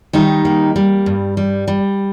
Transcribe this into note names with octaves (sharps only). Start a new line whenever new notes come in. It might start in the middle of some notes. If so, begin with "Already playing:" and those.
D#3 G3 D#4
A#3
G3
G2
G3
G3